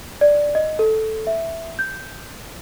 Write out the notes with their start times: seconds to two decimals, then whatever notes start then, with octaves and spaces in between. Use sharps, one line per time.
0.21 D5
0.55 D#5
0.79 A4
1.27 E5
1.79 G6